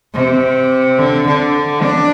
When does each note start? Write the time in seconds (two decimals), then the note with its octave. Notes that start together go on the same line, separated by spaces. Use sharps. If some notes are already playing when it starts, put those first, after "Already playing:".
0.14 C3
0.98 D3
1.27 D3
1.82 D4